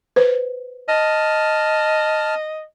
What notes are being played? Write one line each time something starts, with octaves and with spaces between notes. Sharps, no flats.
B4 C5
D#5 A5 F6